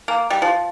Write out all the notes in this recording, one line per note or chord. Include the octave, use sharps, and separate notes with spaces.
A#3
G3
F3